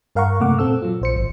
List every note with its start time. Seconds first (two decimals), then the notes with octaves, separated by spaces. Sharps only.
0.15 G2 A#4 F5 F#5 A#5 C#6
0.40 F#2 C3 A3 A#3 F#5 D6
0.59 A#2 C4 A4 E6
0.82 F#3 F4
1.01 A#1 C5 C#7
1.15 G#1